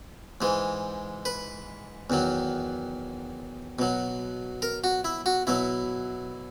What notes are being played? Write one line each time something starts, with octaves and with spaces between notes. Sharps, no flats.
G#2 E3 G#3
B4
E2 D#3 F#3
B2 F#3
A#4
F#4
E4
F#4
B2 F#3 E4